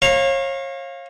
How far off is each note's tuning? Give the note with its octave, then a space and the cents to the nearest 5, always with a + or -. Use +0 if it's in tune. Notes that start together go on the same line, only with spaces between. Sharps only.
C#5 -35 F5 +0 A#5 +0